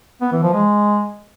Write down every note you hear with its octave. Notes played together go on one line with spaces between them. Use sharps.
B3
E3
F3
G#3